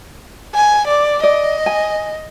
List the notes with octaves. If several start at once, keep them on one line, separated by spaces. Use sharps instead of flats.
G#5
D5
D5 D#5
G#5